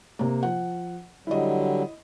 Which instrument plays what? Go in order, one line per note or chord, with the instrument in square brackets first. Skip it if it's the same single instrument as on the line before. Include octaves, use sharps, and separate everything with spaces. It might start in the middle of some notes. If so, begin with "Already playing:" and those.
[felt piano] C3 A#3
F3 F#5
[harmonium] D3 F#3 G3 [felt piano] E4 D#5